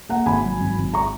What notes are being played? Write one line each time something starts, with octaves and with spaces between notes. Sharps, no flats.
A#3 F#5 A#5
G#1 G#5 B5
F#3
G#1
G#1
A#5 C#6